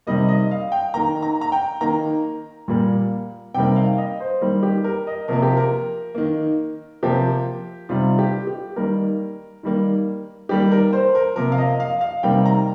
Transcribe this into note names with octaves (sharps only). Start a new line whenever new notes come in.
C3 D#3 G3 A#3 D#5
D#5
F5
G5
D#3 A#3 A#5
A#5
A#5
G5
D#3 A#3 A#5
A#2 G3 A#3
C3 D#3 G3 A#3 G5
F5
D#5
C5
D#3 G3 A#3
G4
A#4
D#5
C3 F3 A#3 A#4
G4
A#4
D#3 A#3
C3 F3 A#3 G4
C3 D#3 G3 F4
G4
G4
D#3 G3 A#3 A#4
D#3 G3 A#3
D#3 G3 A#3 G4
A#4
C5
A#4
C3 F3 A#3 A#4
F5
D#5
F5
F5
C3 D#3 G3 A#3 G5
A#5